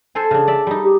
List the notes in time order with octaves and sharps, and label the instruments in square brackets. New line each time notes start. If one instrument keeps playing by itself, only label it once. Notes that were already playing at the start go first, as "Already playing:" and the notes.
[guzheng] A4 C5 G#5
C#3 D4
D5 E5
G3 D#4
[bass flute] G4